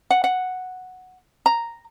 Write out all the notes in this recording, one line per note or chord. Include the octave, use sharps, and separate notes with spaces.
F#5
F#5
A#5